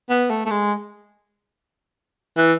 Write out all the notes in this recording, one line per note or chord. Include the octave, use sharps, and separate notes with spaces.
B3
A3
A3
G#3
E3